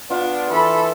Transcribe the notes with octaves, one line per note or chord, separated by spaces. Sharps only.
B3 D4 F4
E3 A4 B5